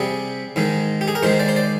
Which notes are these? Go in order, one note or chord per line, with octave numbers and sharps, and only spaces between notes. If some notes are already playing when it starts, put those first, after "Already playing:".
Already playing: C3 G3 G#4
G#2 D#3 G#3
G4
G#4
A#4
G#2 D#3 G#3 C5
D5
C5
D5